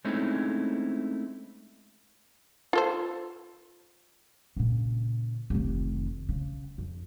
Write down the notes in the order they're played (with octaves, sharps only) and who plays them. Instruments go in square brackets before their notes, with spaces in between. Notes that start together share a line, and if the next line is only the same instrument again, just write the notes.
[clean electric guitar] G#3 A3 C4 C#4 D#4 E4
[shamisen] F4 A4 C5
[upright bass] A#2 C#3
F1 D#3
C#3
F2